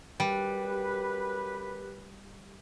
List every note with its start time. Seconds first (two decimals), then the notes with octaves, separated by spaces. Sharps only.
0.20 F#2 G3 G4 B4